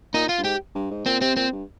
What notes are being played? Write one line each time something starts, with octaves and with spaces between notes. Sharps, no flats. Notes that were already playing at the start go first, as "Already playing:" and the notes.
A#2 D#4
F4
G2
G#2 G4
G2
G#2
A#2 C4
C3 C4
A#2 C4
G2